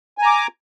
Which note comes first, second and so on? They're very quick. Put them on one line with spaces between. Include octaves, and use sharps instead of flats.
G#5 A#5 D6